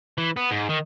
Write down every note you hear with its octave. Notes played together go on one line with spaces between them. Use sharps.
E3
B3
G#2
D#3